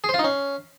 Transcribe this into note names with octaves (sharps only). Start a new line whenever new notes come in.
G#4
C5
F4
D#4
C#4